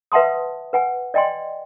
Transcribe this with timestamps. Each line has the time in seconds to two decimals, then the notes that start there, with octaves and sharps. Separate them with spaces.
0.12 B4 E5 F#5 A5 C6 D#6
0.73 B4 F#5 G#5
1.14 D5 D#5 G5 G#5 C6